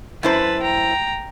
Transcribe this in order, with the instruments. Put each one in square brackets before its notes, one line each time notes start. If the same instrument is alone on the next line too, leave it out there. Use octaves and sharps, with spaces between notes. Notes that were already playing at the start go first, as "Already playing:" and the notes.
[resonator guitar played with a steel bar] F#2 E4 C5 [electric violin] B4 A5
[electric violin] G5 A#5